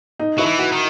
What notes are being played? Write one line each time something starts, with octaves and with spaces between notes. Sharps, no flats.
D#4
F#3 E4
E3
F#4
D#3